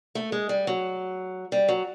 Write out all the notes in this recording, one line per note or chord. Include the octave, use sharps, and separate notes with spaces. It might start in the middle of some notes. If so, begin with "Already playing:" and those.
A3
G#3
G3
F#3
G3
F#3